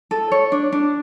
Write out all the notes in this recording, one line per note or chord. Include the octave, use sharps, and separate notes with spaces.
A4
C#5
D4
D4